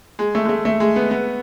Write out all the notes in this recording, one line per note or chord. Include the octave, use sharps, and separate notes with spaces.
G#3
A3
G#3
A3
A3
G#3
B3
B3